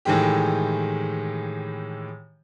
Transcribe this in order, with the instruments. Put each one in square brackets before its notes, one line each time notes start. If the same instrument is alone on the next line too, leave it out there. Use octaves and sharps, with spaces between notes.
[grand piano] A2 D#3 E3 G#3 G4